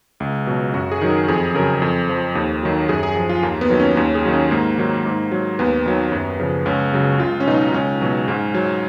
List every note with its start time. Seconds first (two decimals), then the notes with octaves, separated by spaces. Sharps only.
0.20 C#2
0.47 B2 F#3
0.74 F#2 F#4
0.92 G#4
1.01 D#3 F#3
1.10 A#4
1.28 F2 G#4
1.54 C#3 F#3 A#4
1.82 F2
2.09 F3
2.35 D#2
2.63 D#3 F#3
2.89 F#2 G#4
3.03 G#4
3.16 F3 G#4
3.29 F4
3.43 D#2 A#3
3.61 B3
3.70 D#3 F#3
3.80 C#4
3.97 D#2 C#4
4.15 G#4
4.25 D#3 F#3
4.34 C#4
4.51 G#2 A#3
4.78 D#3 F#3
5.05 G#2
5.31 F#3
5.59 D#2 B3
5.86 D#3 F#3
6.12 F#2
6.40 C#3 F3
6.66 C#2 C#4
6.93 C#3 F#3
7.20 C#2 F4
7.40 C#4
7.47 B2 F#3 D#4
7.74 C#2 C#4
8.01 B2 F#3
8.28 G#2
8.54 F#3